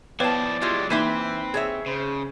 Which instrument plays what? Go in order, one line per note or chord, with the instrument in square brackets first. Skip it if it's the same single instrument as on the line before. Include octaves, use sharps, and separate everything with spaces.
[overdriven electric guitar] F3 E4 [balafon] B3 B4 C#5 [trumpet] D5 [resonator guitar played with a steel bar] F5 A5
[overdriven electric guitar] F#3 G#3 [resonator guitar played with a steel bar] E4 F4 G4
[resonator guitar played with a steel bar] E3 C5 E5 [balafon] A#3 D#4 [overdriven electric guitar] C4 [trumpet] B4
[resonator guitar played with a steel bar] G#4 C#5 E5
[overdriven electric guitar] C#3 [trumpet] C5